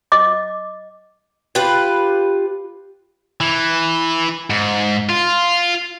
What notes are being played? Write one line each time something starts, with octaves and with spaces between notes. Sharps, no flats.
D#5 D6
F4 G4 B4
E3
G#2
F4